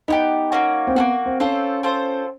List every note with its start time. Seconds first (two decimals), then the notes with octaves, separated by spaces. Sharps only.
0.08 B3 D#4 E4 G4
0.52 A#3 C#4 F#4
0.87 C4
0.95 A#3 B3 C#4 F#4
1.26 C4
1.40 C4 C#4 F4 A4 C5
1.83 C4 F4 A4 C5